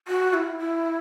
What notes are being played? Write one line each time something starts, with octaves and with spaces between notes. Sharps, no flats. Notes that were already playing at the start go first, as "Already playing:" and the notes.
F#4
E4
E4